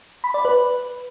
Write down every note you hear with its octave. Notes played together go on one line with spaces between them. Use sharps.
B5
D5
B4